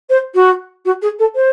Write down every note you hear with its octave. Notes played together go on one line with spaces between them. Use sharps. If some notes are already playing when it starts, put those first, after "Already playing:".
C5
F#4
F#4
G#4
A4
C5